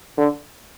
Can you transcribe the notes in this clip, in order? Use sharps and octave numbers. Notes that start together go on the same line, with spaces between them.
D3